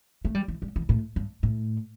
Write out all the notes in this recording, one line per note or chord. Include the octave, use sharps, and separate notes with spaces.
A3
G3
E3
G3
E3
A2
G2
A2